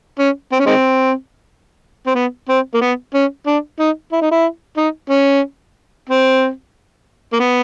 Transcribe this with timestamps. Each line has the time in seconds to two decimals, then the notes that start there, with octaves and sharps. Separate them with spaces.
0.19 C#4
0.52 C4
0.59 C#4
0.66 D#3 G#3 C4
2.07 C4
2.15 B3
2.49 C4
2.74 A#3
2.81 B3
3.14 C#4
3.47 D4
3.79 D#4
4.12 E4
4.21 D#4
4.31 E4
4.77 D#4
5.10 C#4
6.09 C4
7.33 A#3
7.40 B3